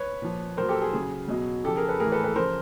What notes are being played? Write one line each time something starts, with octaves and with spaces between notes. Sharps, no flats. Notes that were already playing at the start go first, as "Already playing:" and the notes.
Already playing: B4 C#5
A#2 F3
A#2 F#3 A#4 C5
G4 A4
G#4
C#3 F#3 G#4
B2 F#3
C#3 F3 G4 A4
G#4 A#4
A4 B4
A2 E3 G#4 A#4
A4 B4
A4 B4
C#3 F3 A#4 C5